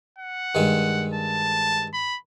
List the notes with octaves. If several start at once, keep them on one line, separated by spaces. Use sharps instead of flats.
F#5
G2 D#3 G#3
A5
B5